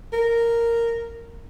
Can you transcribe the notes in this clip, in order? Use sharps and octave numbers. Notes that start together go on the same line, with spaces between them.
A#4